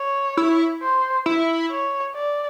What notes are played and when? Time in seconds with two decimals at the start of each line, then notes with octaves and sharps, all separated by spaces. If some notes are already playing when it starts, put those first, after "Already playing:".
Already playing: C#5
0.37 E4
0.82 C5
1.26 E4
1.71 C#5
2.15 D5